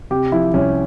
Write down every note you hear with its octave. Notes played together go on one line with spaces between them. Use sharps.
C3 G4
F3 E4
C2 C#4